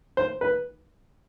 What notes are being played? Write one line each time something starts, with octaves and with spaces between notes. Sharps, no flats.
C5
B4